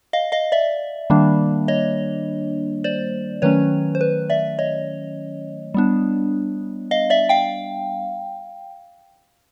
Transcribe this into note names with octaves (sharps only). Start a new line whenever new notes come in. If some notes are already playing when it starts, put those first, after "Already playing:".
D#5 F5
D#5 F5
D5 E5
D#3 G3 A#3 D4
C#5 D#5
C5 D5
D#3 F#3 A3 C#4 B4 C#5
C5
B4
D5 E5
C#5 D#5
G3 B3 D4
D#5 F5
D5 E5
F5 G5